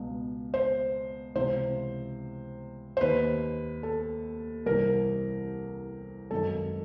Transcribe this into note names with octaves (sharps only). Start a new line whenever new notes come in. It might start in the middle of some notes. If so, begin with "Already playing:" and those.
Already playing: C#2 B2
C5
C#2 C3 E3 C5
C5
D#2 D#3 B4
A4
C2 C3 E3 A#4
G#1 F#2 D#3 A4